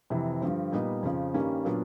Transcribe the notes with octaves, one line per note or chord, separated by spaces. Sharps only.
F2 C3 E3
G2 D3 F3
A#2 G3 B3 D#4
F2 C#3 F3
G2 D#3 G3 A#3 C#4
A#2 F#3 B3 D4 F4